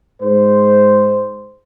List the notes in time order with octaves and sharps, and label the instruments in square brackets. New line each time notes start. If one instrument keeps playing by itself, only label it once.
[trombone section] G#2 G#3 C5